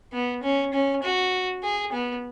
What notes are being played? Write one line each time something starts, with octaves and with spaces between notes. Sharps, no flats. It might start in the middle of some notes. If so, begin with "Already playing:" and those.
B3
C#4
C#4
F#4
G#4
B3